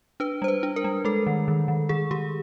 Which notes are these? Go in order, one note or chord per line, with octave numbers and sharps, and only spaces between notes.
D4 B4
G3 C5
B4
D4
A#4
G3
G#3 A4
D#3
D#3
D#3
D#3 G#4
D#3 G4